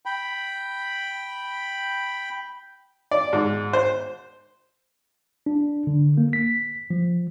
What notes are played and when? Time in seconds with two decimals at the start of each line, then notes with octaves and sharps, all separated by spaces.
0.06 G5 B5
3.11 D5
3.33 G#2
3.73 C5
5.46 D4
5.87 D3
6.18 A#3
6.33 B6
6.90 F3